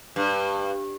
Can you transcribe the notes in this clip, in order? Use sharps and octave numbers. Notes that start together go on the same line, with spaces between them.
G2